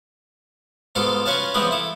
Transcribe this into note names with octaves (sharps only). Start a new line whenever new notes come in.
G#2 B2 F4 A4 F5 C6
C#4 F4 B4 C#5 F5 A5
E3 F3 G#3 B3 C4 B4
E4 A4